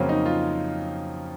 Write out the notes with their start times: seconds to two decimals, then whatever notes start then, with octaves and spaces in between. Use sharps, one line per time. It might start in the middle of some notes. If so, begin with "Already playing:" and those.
Already playing: F2 C#3 F#3 A#3 C4 C#4
0.09 D#4
0.26 F4